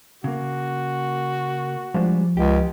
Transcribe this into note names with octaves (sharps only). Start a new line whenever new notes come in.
C#3 A#3 F#4
F3 G3 G#3 D4
C#2 G4